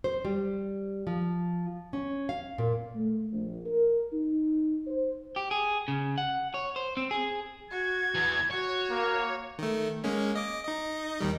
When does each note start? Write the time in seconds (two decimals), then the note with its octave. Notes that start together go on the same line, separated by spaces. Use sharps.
0.04 C5
0.25 G3
1.07 F3
1.93 C#4
2.29 F5
2.58 A#2
2.95 A3
3.33 A#1
3.66 A#4
4.13 D#4
4.88 C5
5.36 G4
5.51 G#4
5.88 C#3
6.18 F#5
6.54 C#5
6.76 C5
6.97 C4
7.11 G#4
7.71 F#4 G#6
8.14 E2 E3
8.51 F#4 C#5
8.91 A#3
9.59 D#3 A3
10.04 G#3 A#3 C#4
10.35 D#5 D6
10.65 D#4 D#5
11.20 D#2 D#3 G3